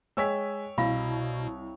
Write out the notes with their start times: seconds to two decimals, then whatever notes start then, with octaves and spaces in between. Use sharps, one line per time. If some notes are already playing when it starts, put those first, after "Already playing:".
0.17 G#3 C#5 G5 G#5 E6 B6
0.78 C2 B2 E4 F5 B5